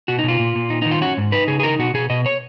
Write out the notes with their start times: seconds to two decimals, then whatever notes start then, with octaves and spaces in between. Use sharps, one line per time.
0.08 B2 F#4
0.19 D#4
0.24 B2 F4
0.39 A#2
0.55 A#2
0.70 D#4
0.82 D#3 D#4
0.91 F4
1.01 C#4 F#4
1.18 G#2
1.32 D#4 B4
1.47 C#3 G#4
1.60 G#4
1.63 D#4 A#4
1.79 B2 F#4
1.94 B2 G#4
2.10 B2 D#5
2.26 C#5